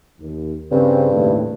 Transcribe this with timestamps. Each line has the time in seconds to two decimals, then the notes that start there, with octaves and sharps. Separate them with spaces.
0.20 D#2
0.72 G2 C#3 C4
1.12 D#2 A2